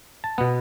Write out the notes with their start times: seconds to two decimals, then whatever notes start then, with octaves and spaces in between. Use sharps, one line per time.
0.24 A5
0.38 B2 B3 F#5